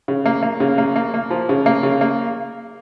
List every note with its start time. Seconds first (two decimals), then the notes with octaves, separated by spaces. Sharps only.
0.08 C#3
0.26 A#3
0.43 A#3
0.60 C#3
0.78 A#3
0.96 A#3
1.14 A#3
1.30 F3
1.49 C#3
1.66 A#3
1.83 C#3
2.01 A#3